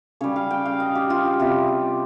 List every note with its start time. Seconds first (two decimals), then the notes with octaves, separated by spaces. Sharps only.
0.21 C#3 G3 C#5
0.36 F5
0.51 G5
0.65 F5
0.80 D#5
0.95 G4
1.10 F4
1.25 G4
1.40 C3 G3 G4